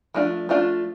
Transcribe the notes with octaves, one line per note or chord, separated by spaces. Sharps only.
F3 A3 D4 F4
F3 A3 D4 F4